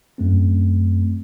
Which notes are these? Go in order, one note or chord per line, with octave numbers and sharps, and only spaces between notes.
F#2 A3 C4